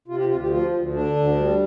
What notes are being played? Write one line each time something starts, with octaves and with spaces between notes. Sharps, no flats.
C3 F4
G4
D2 F4
G4
F3 F4
D2
D3 D4
D2
G3